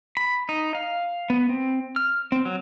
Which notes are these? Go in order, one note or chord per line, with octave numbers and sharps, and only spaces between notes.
B5
D#4
F5
B3
C4
F6
C4
F#3